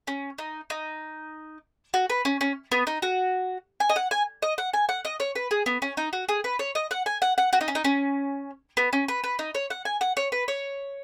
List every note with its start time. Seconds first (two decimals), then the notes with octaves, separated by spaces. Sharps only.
0.07 C#4
0.38 D#4
0.70 D#4
1.94 F#4
2.10 B4
2.25 C#4
2.41 C#4
2.72 B3
2.87 D#4
3.02 F#4
3.80 G#5
3.89 D#5
3.96 F#5
4.11 G#5
4.42 D#5
4.58 F#5
4.73 G#5
4.89 F#5
5.05 D#5
5.20 C#5
5.35 B4
5.51 G#4
5.66 B3
5.82 C#4
5.97 D#4
6.13 F#4
6.29 G#4
6.44 B4
6.59 C#5
6.75 D#5
6.91 F#5
7.06 G#5
7.22 F#5
7.38 F#5
7.53 F#4
7.61 D#4
7.68 C#4
7.75 D#4
7.84 C#4
8.77 B3
8.93 C#4
9.08 B4
9.24 B4
9.39 D#4
9.55 C#5
9.70 F#5
9.85 G#5
10.01 F#5
10.17 C#5
10.32 B4
10.48 C#5